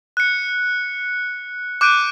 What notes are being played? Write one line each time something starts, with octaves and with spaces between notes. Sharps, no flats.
F#6 C#7
D6 F#6 G6 D7 D#7